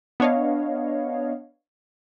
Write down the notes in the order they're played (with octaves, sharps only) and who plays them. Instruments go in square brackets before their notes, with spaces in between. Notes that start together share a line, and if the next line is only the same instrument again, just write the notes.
[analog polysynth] B3 D4 C#5 D#5 F5